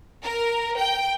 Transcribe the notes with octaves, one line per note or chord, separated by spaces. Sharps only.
A#4
G5